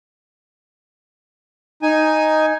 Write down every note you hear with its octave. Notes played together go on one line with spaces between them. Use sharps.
D#4 G#5